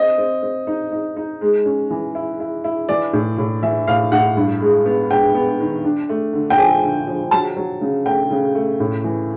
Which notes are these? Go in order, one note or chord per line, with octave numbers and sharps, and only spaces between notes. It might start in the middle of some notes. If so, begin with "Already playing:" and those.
Already playing: C4 D#5
C4
C4
D#4
D#4
D#4
G#3
C#4
E3
E4
E4
E4
E3 D5
A2
A2
E3 E5
A2 F5
A2 F#5
G2
G#3
B3
G#3 G5
B3
D#3
D4
A3
D3
G5
F3 G#5
D3
F3
F#3 A5
F#3
C#3
A3 G5
C#3
A3
A2
E3